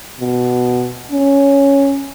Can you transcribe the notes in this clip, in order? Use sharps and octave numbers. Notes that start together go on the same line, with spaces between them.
B2
C#4